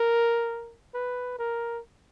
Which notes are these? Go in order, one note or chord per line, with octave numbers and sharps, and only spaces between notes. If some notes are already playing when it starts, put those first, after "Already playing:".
Already playing: A#4
B4
A#4